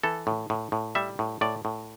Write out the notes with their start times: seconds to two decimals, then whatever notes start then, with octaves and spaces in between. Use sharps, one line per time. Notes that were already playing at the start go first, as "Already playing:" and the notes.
0.03 E3 A4
0.27 A2
0.50 A2
0.72 A2
0.95 G3 E5
1.19 A2
1.41 A2 D5
1.65 A2